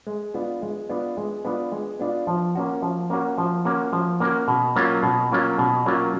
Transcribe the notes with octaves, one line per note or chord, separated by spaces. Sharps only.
G#3
B3 D4 F4
G#3
B3 D4 F4
G#3
B3 D4 F4
G#3
B3 D4 F4
F3
A#3 C#4 F#4
F3
A#3 C#4 F#4
F3
A#3 C#4 F#4
F3
A#3 C#4 F#4
B2
F#3 A#3 C#4 F4
B2
F#3 A#3 C#4 F4
B2
F#3 A#3 C#4 F4